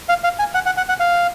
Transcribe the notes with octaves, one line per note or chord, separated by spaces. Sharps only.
F5
F5
G#5
F#5
F#5
F#5
F#5
F5